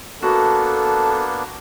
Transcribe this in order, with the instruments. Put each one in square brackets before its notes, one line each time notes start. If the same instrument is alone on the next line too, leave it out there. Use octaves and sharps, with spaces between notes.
[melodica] A#3 B3 D4 [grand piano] F#4 [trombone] A4